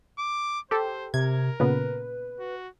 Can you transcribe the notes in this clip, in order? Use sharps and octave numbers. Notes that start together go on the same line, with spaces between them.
D6
G4 A4 C5
C3 A#4 G#6
A#2 C#3 B3 B4
F#4